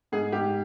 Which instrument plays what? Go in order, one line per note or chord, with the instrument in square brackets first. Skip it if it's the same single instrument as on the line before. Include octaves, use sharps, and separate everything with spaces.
[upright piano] G#2 G#4
G#2 G4